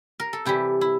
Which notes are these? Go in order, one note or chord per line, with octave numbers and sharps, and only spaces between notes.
A#4
A4
C3 E3 G3 E4 G4
E4